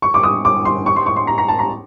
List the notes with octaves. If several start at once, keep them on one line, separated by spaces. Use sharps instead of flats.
C#6
D6
D#6
D6
C6
C#6
C6
C#6
C6
A#5
A#5
A5
A#5